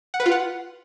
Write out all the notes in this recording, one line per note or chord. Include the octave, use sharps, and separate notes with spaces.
F#5
B4
F4
F#5